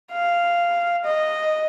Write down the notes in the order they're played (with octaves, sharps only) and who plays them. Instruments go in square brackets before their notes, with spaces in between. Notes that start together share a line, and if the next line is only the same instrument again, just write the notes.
[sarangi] F5
D#5